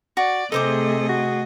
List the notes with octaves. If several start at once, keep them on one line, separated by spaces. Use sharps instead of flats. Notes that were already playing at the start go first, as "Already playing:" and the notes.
F#4 D5
C3 A3 D#4 G#4 A4 C5 D#5 D6
F#4